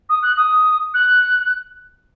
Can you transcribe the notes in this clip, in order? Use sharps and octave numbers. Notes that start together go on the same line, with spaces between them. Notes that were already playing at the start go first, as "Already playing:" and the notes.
D#6
F#6
D#6
F#6